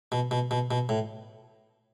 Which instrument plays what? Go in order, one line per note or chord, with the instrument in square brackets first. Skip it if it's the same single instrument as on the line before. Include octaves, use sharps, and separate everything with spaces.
[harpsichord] B2
B2
B2
B2
A2